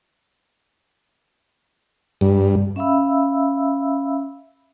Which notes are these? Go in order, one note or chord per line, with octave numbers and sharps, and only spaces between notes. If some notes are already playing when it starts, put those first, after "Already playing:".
G2
C#4 E5 F5 B5 E6